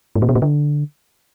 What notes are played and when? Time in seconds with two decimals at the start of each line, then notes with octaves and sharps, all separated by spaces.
0.16 G#2
0.22 A#2
0.29 B2
0.35 A#2
0.42 D3